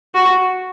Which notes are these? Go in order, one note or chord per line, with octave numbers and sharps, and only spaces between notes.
F#4